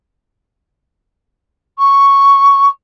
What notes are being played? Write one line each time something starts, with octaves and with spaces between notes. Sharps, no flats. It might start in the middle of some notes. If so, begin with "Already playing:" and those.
C#6